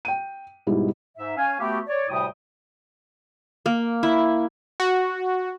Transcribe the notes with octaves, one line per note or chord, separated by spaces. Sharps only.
G5 D#7
G#2 B2 G3 D#4 E4
G#2 E5
C#4 F5 G#5
A3 B3 F#4 G4
C#5 D5
D2 A2 C3 G3 G5 D#6
A#3
E4
F#4